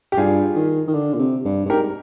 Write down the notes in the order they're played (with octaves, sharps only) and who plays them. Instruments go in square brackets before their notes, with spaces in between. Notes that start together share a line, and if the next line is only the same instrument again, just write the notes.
[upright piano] G4
[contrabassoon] G2 [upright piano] F4 G#4
[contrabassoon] D#3
D#3
D3
A#2
C3
G2
G2
[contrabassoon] G#2 [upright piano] G4 A#4